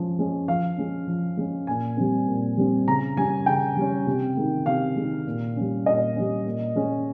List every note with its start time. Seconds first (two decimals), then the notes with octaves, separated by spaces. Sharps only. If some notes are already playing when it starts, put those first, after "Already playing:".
Already playing: F3 G#3 C#4
0.19 G#3 C#4
0.48 F3 F5
0.78 G#3 C#4
1.07 F3
1.37 G#3 C#4
1.67 A#2 G#5
1.97 G3 C4
2.27 A#2
2.57 G3 C4
2.87 C#3 A#5
3.17 G3 C#4 G#5
3.46 C#3 G5
3.77 G3 C#4
4.07 C3
4.37 D#3 G#3
4.66 C3 F5
4.96 D#3 G#3
5.27 A#2
5.56 G3 C#4
5.86 A#2 D#5
6.16 G3 C#4
6.46 A#2
6.76 G#3 C#4